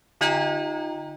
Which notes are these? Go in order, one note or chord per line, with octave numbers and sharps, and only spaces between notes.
D3 D#4 F4 D#5 G5 A#5